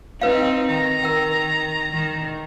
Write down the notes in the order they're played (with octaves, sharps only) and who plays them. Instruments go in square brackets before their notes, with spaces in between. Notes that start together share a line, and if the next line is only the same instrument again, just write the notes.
[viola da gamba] C4 D#4 [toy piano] B4 C#5 F5
[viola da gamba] D#3 [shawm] A#5
[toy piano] A#4 G5
[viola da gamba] D#3